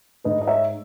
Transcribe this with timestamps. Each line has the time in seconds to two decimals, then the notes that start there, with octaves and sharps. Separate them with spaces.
0.24 G#2 B4 D#5
0.42 D#5
0.47 C#5 E5